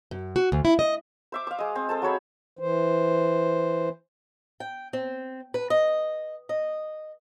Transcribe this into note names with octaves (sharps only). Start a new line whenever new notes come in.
F#2
F#4
D2
E4
D#5
C5 E5 D6
F5 D6
G#3 D#5
C4
A4 C5 A5
F#3 G#3 C#5 B5
E3 C5
G5
C4
B4
D#5
D#5